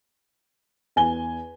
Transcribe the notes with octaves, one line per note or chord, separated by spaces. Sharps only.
E2 G#5 G7